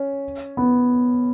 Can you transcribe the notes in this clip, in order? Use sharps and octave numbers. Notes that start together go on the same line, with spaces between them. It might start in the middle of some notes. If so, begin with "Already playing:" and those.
Already playing: C#4
B3